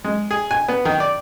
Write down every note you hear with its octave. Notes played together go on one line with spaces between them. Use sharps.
G#3
G#4
G#5
B3
D#3
D5